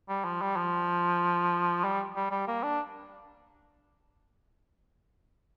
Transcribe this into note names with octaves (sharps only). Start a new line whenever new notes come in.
G3
F3
G3
F3
G3
G3
G3
A#3
D4